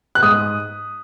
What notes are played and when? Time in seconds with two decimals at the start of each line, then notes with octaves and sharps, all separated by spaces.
0.15 F#6
0.23 G#2 D#6